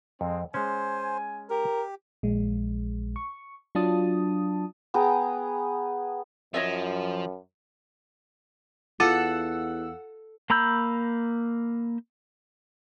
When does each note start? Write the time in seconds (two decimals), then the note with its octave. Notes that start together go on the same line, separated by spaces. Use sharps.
0.21 F2 G#3 C4
0.54 G#3 C#4 C5 G#5
1.50 G4 A#4
2.23 A#1 G#3
3.16 C#6
3.75 F#3 D4 F4 A5 D#6
4.94 B3 G#4 G5 A#5
6.54 F#2 F3 C#5 D#5 E5
9.00 E2 F4 A4 F5 F#5 E6
10.50 A#3 A#5 B5 E6 G6